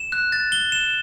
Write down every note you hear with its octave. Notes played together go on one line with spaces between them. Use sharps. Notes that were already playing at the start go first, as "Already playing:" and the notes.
Already playing: E7
F#6
A6
G7
E7